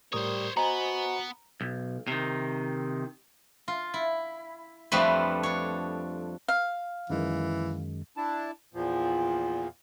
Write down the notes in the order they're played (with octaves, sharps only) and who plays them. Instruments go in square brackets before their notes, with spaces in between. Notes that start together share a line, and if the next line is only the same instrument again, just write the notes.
[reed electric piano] A2 A#4 D#6 [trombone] G3 [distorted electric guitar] C5 C#5
[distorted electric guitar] B3 [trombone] F#4 [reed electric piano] C5 D#5 G#5 [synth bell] A#5
[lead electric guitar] B1
C3 D#3
[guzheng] F4
E4
F2 F3 G3 A3 D4 B4
D4 C#5
[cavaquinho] F5
[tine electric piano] F#2 D#3 G#3 [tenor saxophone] E3
[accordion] D4 E4 A5
E2 A#2 F3